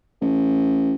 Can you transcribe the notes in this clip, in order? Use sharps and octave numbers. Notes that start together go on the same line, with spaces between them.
A1